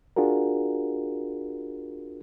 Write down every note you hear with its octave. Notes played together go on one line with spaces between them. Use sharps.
D4 F4 F#4 G#4 A#4